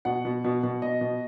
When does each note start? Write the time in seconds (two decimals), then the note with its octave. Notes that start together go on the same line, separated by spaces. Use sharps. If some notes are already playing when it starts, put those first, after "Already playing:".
0.05 B2 F#5
0.25 B2
0.44 B2
0.63 B2
0.82 B2 D#5
1.01 B2